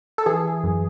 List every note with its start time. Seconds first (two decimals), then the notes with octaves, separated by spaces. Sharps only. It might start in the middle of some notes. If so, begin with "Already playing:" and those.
0.18 A4
0.26 E3 G#4
0.64 F#2